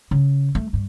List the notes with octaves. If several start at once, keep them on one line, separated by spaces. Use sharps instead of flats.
C#3
A3
G2